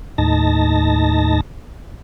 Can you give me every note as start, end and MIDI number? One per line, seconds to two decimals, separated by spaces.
0.18 1.41 39
0.18 1.41 45
0.18 1.41 63
0.18 1.41 81
0.18 1.41 94